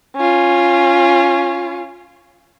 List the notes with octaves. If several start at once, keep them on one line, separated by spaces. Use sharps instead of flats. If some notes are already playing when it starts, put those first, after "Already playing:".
C#4 F4